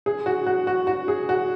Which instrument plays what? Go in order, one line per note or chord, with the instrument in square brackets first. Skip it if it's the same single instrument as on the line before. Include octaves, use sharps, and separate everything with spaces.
[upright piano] G#4
F#4
F#4
F#4
F#4
G#4
F#4